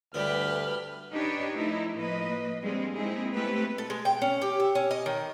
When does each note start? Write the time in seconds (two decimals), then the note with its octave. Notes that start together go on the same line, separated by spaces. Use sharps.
0.14 D2 G2 D3 B3 G4 B4 F6
1.13 D4 D#4 G4 B4 C#5
1.55 F3 A3 D#4 E4
1.92 A2 F3 A#3 B4 D#5
2.62 G3 G#3 A#3 C4 D4 G#4
2.95 G#3 A#3 C4 D#4 E4 G#4
3.34 A3 B3 C4 E4 G4 B4
3.78 A4
3.90 G#3
4.05 G5
4.22 C#4
4.42 G4
4.60 E5
4.75 C#4
4.91 D#5
5.06 D#3